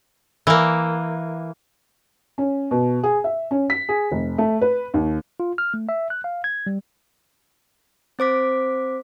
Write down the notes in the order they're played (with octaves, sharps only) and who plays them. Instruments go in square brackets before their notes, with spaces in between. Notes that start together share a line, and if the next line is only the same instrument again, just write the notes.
[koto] E3 A#3
[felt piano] C#4
B2
G#4
E5
C#4
B6
G#4
F1
A3
B4
D#2
[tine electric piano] F4
F6
A3
E5
F#6
F5
G#6
G3
[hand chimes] C4 C5 D6 B6